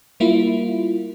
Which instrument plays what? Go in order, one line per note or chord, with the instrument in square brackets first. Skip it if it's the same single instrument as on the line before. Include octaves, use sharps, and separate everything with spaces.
[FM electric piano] G3 A#3 E4 F4